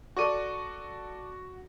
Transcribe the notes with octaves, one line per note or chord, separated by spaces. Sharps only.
F#4 A4 D5 C#6 D#7